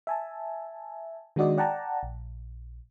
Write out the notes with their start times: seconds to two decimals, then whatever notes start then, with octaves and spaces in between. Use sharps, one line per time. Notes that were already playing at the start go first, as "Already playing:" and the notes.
0.07 E5 G#5 A5
1.36 D#3 G#3 D4 F#4 D5 D#5
1.58 D5 F#5 G5 A5 A#5
2.03 A#1